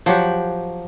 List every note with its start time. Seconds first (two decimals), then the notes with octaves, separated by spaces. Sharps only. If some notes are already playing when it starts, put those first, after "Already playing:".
0.06 F3 F#3 G4 F#5